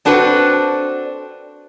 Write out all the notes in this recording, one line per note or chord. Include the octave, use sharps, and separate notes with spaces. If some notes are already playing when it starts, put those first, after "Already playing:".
C4 D4 F#4 A4 B4 C5